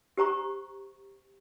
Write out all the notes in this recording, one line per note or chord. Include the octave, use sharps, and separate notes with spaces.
G4 C5 A#5 C#6